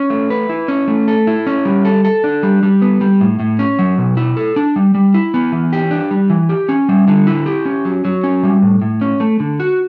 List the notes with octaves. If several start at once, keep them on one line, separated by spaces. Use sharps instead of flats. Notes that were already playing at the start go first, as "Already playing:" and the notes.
Already playing: C#4
A3
B4
E4
C#4
A3
A4
E4
C#4
G3
A4
A4
D4
G3
G3
B3
G3
A2
A2
C#4
F#3
B2
E4
A4
D4
G3
G3
E4
B3
E3
G4
D4
G3
E3
G4
C#4
G3
D3
E4
G4
C#4
F#3
F#3
C#4
G3
A2
A2
C#4
A3
D3
F#4